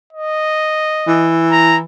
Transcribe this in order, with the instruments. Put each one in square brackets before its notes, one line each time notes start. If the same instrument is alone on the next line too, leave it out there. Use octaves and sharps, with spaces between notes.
[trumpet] D#5
[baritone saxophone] E3
[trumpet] A#5